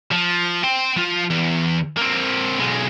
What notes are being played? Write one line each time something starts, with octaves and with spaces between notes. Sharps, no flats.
F3
G5 C6
F3 F4
E2
A#3 C4
B1 G#3